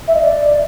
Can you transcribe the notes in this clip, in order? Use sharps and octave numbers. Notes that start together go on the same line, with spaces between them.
E5
D#5
D5